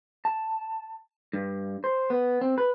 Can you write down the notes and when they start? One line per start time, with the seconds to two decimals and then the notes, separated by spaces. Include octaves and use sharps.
0.25 A5
1.33 G2
1.84 C5
2.10 B3
2.41 C4
2.58 B4